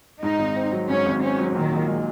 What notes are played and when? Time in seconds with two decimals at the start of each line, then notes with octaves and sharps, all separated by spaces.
0.22 G#2 D#4
0.39 G#1
0.56 C4
0.72 F#3
0.89 G#2 C#4
1.06 G#1
1.22 C4 C#4
1.39 F#3
1.55 A#2 D#3
1.72 A#1
1.88 G#3